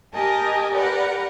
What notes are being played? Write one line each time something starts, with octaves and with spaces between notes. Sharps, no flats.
G4 A#4 D#5 G#5 A5
G4 A#4 B4 D5 F#5